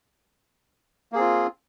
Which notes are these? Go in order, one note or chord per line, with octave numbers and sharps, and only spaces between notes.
A#3 C4 F4 G#4